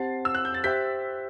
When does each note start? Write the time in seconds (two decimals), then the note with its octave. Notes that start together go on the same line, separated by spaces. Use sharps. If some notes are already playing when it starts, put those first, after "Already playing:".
Already playing: C4 G4 C5 F#5 A5 A6 C7
0.25 E6
0.35 F#6
0.45 G6
0.54 A6
0.64 G4 C5 E5 G5 G6 B6